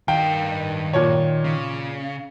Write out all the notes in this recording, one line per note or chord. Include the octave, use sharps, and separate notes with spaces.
G2 D#3 F5 G5
A#2 C#5
C#3